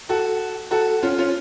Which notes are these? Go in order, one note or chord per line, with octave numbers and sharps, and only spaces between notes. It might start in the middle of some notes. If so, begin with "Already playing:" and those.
F#4 A4
F#4 A4
C#4 F4
C#4 F4